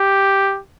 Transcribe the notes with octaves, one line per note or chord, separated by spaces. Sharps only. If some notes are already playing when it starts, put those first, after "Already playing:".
Already playing: G4